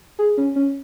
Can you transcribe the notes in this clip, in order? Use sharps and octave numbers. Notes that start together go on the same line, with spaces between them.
G#4
C#4
C#4